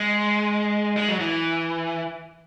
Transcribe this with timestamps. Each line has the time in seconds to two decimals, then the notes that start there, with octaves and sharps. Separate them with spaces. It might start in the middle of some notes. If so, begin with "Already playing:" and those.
Already playing: G#3
0.97 G#3
1.09 F#3
1.20 E3